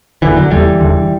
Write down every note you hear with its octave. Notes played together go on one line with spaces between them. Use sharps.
F#1 E2 D3 E3
D3 F#3
F#1 E2 D3 E3 G3
F#1 E2 D3